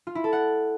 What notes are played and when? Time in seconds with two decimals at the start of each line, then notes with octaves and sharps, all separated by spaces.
0.07 F4
0.15 E4
0.24 A4
0.33 F#5